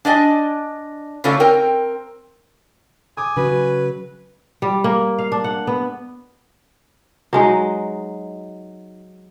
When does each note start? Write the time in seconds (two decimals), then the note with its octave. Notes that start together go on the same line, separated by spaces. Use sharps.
0.05 D4 D5 D#5 G#5
1.24 C#3 A3 C#4 F4 C#5 D5
1.40 C4 A#4 G5
3.17 G#5 D6 D#6
3.37 C#3 F#3 F#4 B4
4.62 G3
4.84 A#3
5.18 F5
5.32 D4
5.44 F#5
5.67 B3
7.33 F#3 G#3 D#4